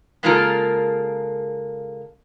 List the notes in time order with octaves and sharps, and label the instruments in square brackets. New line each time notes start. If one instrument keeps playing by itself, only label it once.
[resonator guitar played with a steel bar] C#3 G#3 A#3 F4 A4 A#4